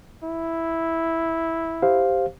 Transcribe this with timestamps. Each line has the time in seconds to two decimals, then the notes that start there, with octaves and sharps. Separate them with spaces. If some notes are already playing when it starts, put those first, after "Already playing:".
0.24 E4
1.83 G4 C5 F5